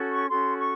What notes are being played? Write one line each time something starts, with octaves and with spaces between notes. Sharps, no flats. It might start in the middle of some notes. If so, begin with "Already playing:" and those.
Already playing: C#4 F#4 A4
C#6
C#4 F#4 A4 C6
C#6